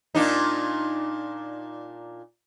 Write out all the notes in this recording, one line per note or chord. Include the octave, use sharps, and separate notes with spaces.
A#2 D4 D#4